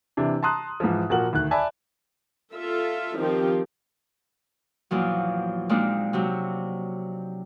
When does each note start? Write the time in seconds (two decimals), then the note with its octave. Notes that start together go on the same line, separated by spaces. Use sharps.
0.17 C3 E3 D4
0.43 A5 A#5 C6 D#6 F#6
0.80 G#2 E3 F3
1.10 A#2 F3 F#4 A#4 F#5 F#7
1.33 D2 D#3 F#6
1.51 D5 E5 G#5 A5 B5
2.52 F4 A4 E5
3.18 D#3 F3 C4 G4
4.91 E2 A#2 F3 F#3
5.69 A#2 G#3 A#3 C4 D4 D#4
6.13 C3 F#3 C4